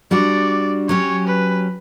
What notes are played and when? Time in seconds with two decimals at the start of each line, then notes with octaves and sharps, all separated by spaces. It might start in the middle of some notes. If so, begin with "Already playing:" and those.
0.11 G3 D4 F#4 D5
0.89 F#3 C#4 G4 C#5
1.27 B4